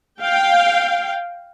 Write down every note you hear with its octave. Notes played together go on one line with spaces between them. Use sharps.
F5 G5